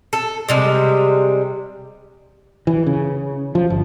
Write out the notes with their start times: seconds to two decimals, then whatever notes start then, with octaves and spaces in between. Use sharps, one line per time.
0.13 A4
0.48 C3 G3 G#3
2.67 E3
2.87 C#3
3.55 F3
3.70 G1